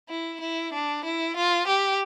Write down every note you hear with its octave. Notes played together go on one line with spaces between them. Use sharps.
E4
E4
D4
E4
F4
G4